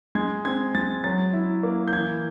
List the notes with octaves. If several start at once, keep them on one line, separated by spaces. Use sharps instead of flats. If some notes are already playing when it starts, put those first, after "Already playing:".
G#3 G#6
C4 G#6
G#3 A6
F#3 A6
E4
A#3
G6
E3 G#6